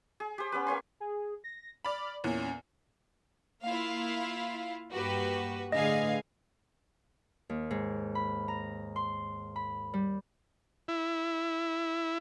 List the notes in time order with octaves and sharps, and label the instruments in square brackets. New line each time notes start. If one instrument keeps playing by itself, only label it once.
[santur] G#4
G4 C5
B3 C#4 G4 B4
A#3 G4 C#5 C6
[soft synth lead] G#4
A#6
[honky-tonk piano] D5 B5 [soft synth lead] F6
[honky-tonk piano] E2 A#2 [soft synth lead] C#4
[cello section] A#3 [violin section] E4 F4 F5
[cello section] G2 A#3 G4 [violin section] F#4 B4
[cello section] A2 D3 G#4 [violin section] B4 F5 G#5 [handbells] D#5
[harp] D#2
G#2
B5
A#5
C6
B5
G3
[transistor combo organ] E4